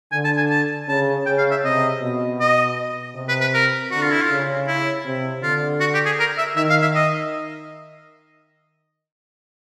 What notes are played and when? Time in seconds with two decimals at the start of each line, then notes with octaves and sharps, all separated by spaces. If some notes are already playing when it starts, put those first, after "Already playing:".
0.12 D3 G#5
0.24 A5
0.37 G#5
0.50 A5
0.88 C#3 A5
1.26 C#3 G5
1.38 F5
1.51 E5
1.64 C3 D#5
2.02 B2
2.40 D#5
3.15 C3
3.29 B4
3.41 B4
3.54 A#4
3.91 D3 F#4
4.01 F4
4.12 E4
4.22 F4
4.29 C#3
4.67 E4
5.05 C3
5.43 D3 F4
5.80 F#4
5.94 G4
6.06 G#4
6.19 A#4
6.38 E5
6.56 D#3 E5
6.70 F5
6.82 E5
6.95 D#5